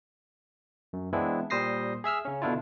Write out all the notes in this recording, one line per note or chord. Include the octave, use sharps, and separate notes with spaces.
F#2
E3 G#3 B3 C4 D4 E4
A#2 G3 C5 D#6 A#6 C7
G#4 E5 E6 F6
C#3 C#4
B2 D3 D4 E4 F4